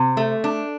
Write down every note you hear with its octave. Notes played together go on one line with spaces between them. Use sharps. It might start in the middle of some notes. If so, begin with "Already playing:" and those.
Already playing: C3
A3
D4